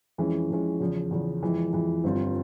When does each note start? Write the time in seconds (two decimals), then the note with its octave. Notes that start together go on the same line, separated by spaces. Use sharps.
0.18 F2 E3 G#3 C#4
0.50 F2 E3 G#3 C#4
0.80 E2 C#3 F3
1.11 E2 C#3 F3
1.42 F2 E3 G#3
1.73 F2 E3 G#3
2.04 G1 G2 G3 C4 F4